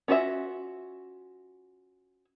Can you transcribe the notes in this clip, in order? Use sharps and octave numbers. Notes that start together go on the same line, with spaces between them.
C#4 F4 F#4 A4 E5